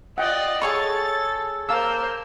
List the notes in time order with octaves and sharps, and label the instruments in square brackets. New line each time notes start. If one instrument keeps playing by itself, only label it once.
[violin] F4 D5 [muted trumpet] D#5 [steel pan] F#5 G5
[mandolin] G#4 C#5 C#6 [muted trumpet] A4 [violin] A6
[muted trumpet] A#3 [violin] A#4 C5 [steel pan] F5 A5 E6